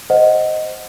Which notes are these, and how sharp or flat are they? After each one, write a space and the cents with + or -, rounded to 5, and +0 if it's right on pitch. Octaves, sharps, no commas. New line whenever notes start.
C5 +0 D#5 +0 F#5 +0